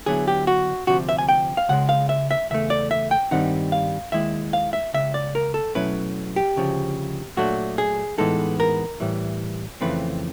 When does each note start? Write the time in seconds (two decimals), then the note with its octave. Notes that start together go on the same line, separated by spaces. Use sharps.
0.06 D3 F#3 B3 E4 G#4
0.28 G4
0.47 F#4
0.87 D2 C3 F3 F#4
1.09 E5
1.18 G#5
1.29 G5
1.57 F5
1.69 C#2 C#3 G#3 F#5
1.89 F5
2.09 E5
2.31 E5
2.50 E2 C#3 A3 E5
2.70 D5
2.91 E5
3.11 G5
3.31 G2 D#3 G3 C4 D#4 F#5
3.72 F5
4.12 D#2 D#3 G#3 E4 E5
4.53 F5
4.73 E5
4.94 C#2 C#3 E5
5.14 D5
5.35 A#4
5.54 A4
5.75 B2 F#3 A3 C#4 E4 B4
6.36 G4
6.56 D2 C#3 F3
7.37 A#2 F#3 A3 D4 F#4
7.78 G#4
8.18 A2 E3 G#3 B3 D#4 A4
8.60 A#4
9.00 A2 E3 G3
9.81 F2 C#3 E3 A3 C4 B4